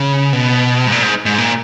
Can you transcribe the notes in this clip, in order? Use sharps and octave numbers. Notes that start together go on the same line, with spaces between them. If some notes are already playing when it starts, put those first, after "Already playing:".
Already playing: C#3
B2
G#2
A#2
G#2
G#2
A#2